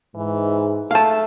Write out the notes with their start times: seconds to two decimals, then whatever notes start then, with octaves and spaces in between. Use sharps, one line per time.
0.15 G#2 E3
0.91 A3 F5 A5